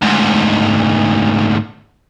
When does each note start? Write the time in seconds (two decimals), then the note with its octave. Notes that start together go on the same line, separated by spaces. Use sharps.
0.02 D2 G#2